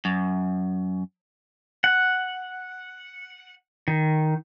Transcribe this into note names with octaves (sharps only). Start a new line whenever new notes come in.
F#2
F#5
D#3